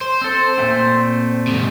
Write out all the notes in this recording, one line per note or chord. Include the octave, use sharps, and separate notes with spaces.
C5
C4 A4
A#2 A3 C4
G#2 C3